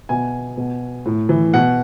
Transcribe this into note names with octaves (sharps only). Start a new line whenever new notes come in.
B2 G#5
B2
A2
E3
B2 F#5